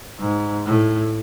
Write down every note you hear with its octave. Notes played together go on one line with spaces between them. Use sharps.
G#2
A2